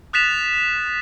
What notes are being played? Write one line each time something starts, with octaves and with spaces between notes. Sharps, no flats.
D#6 F#6 A6 B6 E7 F7